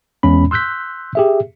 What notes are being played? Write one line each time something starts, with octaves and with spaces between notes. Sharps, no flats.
E2 G#3 C#4 B5
C6 E6 F#6 G6 B6
G4 G#4 E5